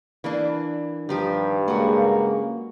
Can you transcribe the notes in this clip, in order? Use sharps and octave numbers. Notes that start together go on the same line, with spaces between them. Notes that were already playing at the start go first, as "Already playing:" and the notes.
E3 A#3 D4
G2 D#3 F3 G4
C#3 F#3 G#3 A#3 F#4